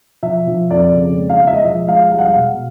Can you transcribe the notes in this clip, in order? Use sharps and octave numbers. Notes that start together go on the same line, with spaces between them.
F3 E5
F3
F2 D5
C#3
G#3
F5
G#3
E5
D#5
F3 E5
G#3 F5
G3 F5
F#5
F5
B2